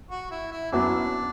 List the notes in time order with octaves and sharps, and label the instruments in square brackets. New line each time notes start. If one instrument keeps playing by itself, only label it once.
[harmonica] F#4
E4
E4
[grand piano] F#2 F#3 B3 E4 [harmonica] D4